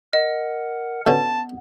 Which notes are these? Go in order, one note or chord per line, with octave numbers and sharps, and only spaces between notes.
A#4 D#5 F#5
B2 D3 B3 C#4 A5